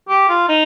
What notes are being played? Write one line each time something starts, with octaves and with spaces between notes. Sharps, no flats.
G4
F4
D#4